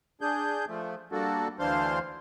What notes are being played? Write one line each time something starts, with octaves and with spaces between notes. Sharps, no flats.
D4 G#4 G6
F3 A3
G3 A#3 D4 F#4 A4
D2 E3 D4 C5 F5 C6